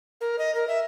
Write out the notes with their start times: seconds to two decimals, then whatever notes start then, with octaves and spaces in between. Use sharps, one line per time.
0.21 A#4
0.39 D#5
0.55 A#4
0.68 E5